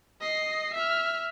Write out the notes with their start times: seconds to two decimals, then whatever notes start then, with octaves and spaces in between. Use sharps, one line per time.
0.21 D#5 C7
0.74 E5 F6